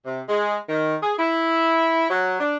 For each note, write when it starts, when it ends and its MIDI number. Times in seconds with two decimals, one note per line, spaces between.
0.06 0.21 48
0.28 0.56 56
0.69 0.95 51
1.02 1.13 68
1.18 2.07 64
2.10 2.36 54
2.40 2.56 62